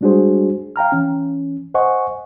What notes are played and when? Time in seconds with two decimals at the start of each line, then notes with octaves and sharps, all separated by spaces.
0.01 G3 G#3 D4 F#4 G#4 C5
0.76 F5 G5 A#5 F6
0.92 E3 C#4
1.75 C5 D#5 F#5 G#5 C#6